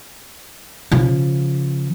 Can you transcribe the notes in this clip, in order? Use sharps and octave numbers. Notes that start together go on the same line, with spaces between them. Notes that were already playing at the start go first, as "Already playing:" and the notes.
C#3 F3